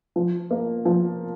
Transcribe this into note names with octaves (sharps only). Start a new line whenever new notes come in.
F3
A#3
F3